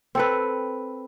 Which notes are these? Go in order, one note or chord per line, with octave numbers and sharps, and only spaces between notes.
C4 A4 B4